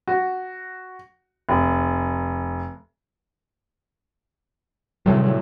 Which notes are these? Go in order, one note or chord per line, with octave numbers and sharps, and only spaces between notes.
F#4
F1
A2 C3 D#3 F#3 G3 A3